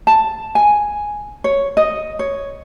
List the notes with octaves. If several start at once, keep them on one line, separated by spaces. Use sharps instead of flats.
A5
G#5
C#5
D#5
C#5